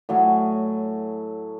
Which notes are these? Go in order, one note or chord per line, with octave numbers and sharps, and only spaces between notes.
A2 F#3 G#5